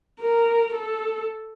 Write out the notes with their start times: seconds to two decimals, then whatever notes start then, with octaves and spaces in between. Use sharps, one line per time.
0.21 A#4
0.74 A4